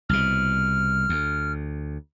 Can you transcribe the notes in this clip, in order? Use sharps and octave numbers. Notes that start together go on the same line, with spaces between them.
C2 B2 F6
D2